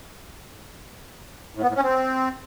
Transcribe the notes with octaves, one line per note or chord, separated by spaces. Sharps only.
A2
B3
A2
C#4
C4